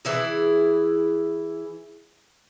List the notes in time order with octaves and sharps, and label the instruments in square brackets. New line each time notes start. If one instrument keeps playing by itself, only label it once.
[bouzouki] E3 E4 G#4